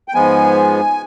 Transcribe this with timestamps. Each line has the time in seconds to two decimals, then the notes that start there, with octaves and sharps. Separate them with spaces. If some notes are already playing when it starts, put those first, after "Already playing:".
0.08 G5
0.14 G#2 F3 G#3 B3 G#5